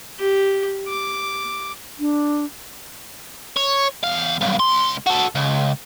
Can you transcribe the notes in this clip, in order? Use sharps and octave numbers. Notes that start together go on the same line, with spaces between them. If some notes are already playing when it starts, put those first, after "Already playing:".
G4
D6
D4
C#5
E2 F5
B1 G2
C#2 C6
F#4 A4
C#2